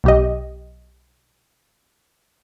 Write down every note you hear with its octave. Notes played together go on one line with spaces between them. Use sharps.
B1 G4 D#5